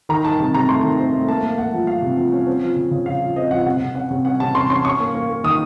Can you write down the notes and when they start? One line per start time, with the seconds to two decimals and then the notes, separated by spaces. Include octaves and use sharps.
0.09 D#3 A#5
0.25 D#3 A5
0.39 C3 A5
0.54 C3 A#5
0.68 A3 C6
0.83 D#3
0.99 C4
1.14 A3
1.28 A#3 A5
1.43 A#3
1.58 A#3 F#5
1.73 F3
1.87 F3 F5
2.02 C3
2.17 F3
2.32 C#4
2.47 C4
2.62 F3
2.76 C#3
2.91 C#3
3.06 F3 F5
3.21 F3
3.36 C4 D#5
3.51 F3 F#5
3.66 C3 F#5
3.80 C3
3.95 C#4 F#5
4.11 C3
4.25 C#4 F#5
4.40 C3 A5
4.55 C#4 C6
4.70 C#4 C6
4.85 C#4 C#6
5.00 A#3
5.14 A#3
5.29 A#3
5.44 D#3 D#6